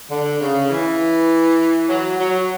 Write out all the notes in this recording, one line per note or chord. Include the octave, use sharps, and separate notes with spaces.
D3
C#3
E3
F#3
F#3